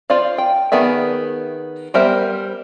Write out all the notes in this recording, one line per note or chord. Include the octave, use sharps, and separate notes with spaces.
F4 C5 D5 F5
G5
D#3 B3 G#4 D5 E5
G3 B3 A#4 C5 E5